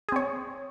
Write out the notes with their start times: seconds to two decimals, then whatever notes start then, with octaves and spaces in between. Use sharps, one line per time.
0.09 G#4
0.12 C4
0.16 C#5